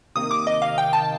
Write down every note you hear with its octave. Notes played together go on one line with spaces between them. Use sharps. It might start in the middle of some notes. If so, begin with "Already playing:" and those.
C3 D#3 A#3 D#6
D6
D#5
F5
G5
A5